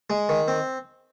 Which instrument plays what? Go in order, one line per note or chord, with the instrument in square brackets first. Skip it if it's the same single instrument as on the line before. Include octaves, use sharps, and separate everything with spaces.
[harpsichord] G#3
D#3
C4